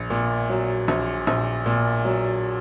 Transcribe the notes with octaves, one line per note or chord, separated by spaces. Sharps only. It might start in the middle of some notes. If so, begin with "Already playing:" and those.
Already playing: A#1
A#2
F#3
A#1
A#1
A#2
F#3